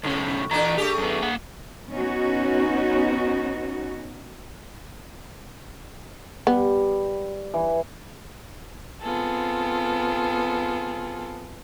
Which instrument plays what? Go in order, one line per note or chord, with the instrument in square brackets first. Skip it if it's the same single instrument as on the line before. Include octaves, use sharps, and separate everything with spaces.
[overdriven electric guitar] B1 C#4 [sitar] A2 C#3
[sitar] A#2 A3 D4 [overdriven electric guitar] E3 A#5
[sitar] A3 D4 G#4 [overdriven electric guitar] G4
[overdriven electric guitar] F#2 B3
A#3 F#5
[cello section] B3 C#4 D#4 F#4
[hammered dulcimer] G3 [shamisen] B3
[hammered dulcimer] E3
[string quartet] B3 C4 F4 G#4 A4